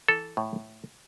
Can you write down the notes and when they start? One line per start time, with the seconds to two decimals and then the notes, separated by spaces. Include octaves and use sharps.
0.08 E3 A4
0.37 A2